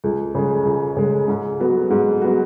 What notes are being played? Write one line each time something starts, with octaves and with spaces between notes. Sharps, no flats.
C#2
C#3 G#3
C#2
C#3 G#3
G#2
F#3 B3 F#4
G#2
F#3 B3 F#4